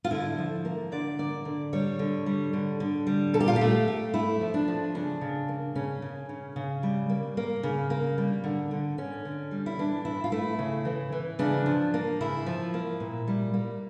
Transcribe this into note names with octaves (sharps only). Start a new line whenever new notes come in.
F4
D3 E4
F3
A#3
D3 D5
A#3 D5
D3
G3 C#5
D3
G3
D3
D3
G3
A#2 A4
G4
F4
G4
A3
A3
A3 E4
F3
D4
F3
C#3 D4
C#3
A#3
C#3 C#4
C#3
C#3
C#3
G3
A#3
A#3
C#3
A#3
G3
D3
D3
D3 C#4
D3
G3
E4
E3 D4
E3 E4
F4
A3 E4
C#3
E3
E3
C#3 D4
F3
A#3
C#3 E4
F3
A#3
A#2
G3
A#3